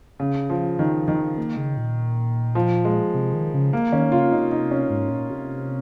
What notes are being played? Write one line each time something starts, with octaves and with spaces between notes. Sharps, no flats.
C#3
F3
D#3
D#3
A#3
C#3
A#2
F3
G#3
C3
D#3
C#3
A#3
D#3 C#4
C#3 F4
C3 D#4
D#4
C#4
G#2
A#2
C3